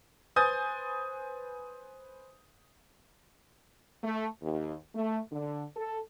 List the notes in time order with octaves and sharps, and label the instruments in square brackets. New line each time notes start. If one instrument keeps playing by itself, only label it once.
[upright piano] B4 C5 G#5 D#6 G6 A6
[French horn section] A3
D#2
A3
D3
A4